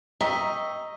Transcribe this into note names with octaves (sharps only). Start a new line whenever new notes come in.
D#5 G5 A#5 C#6 E6 B6